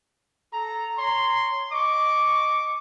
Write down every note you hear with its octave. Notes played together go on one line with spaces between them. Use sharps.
A4 A#5
C#5 A#5 C6
D#5 C#6 D6